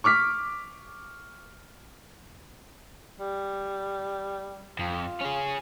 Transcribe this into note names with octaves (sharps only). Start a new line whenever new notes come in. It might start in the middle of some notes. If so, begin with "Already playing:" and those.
C#6 D6 F6 B6
G3
F2 F4
C#4 G#4